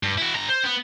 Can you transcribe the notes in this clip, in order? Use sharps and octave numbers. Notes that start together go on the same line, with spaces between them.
G2
E4 F#4
G2 A#5
C5
B3